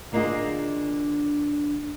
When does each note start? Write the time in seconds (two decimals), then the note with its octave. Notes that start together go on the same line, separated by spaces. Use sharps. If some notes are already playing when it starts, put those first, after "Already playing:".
0.12 D3 A#3 D4 D#4 F4 G#4